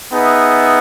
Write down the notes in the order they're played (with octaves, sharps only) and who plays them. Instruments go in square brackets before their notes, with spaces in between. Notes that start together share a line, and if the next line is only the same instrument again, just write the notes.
[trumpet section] B3 D#4 G#4 B4 E5